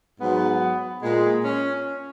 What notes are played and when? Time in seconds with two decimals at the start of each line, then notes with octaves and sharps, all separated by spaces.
0.20 G#2 F#3 B3
1.03 A#2 G#3
1.45 C#4